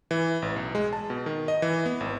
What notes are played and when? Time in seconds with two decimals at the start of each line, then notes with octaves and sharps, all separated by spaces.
0.11 E3
0.42 A1
0.56 B1
0.75 G#3
0.93 A5
1.10 B2
1.26 D#3
1.48 D#5
1.62 E3
1.86 B3
2.00 G#1